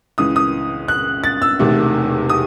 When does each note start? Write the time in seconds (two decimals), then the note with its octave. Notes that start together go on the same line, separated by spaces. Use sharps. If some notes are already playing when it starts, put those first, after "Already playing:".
0.18 C#2 C#3 E3 D#6
0.36 D#6
0.88 F#6
1.24 A6
1.42 E6
1.59 E1 E2 C3 D#3 A3
2.29 D#6